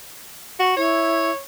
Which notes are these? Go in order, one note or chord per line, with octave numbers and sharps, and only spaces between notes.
F#4
E4 C#5